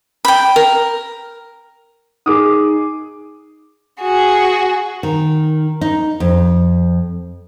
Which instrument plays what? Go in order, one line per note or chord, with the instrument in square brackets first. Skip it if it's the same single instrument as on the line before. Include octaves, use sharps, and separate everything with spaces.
[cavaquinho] G5 B5
A#4
[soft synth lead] D#4 [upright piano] G#4 D6 D#6
[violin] F#4 G#4
[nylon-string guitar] D#3
D#4
F2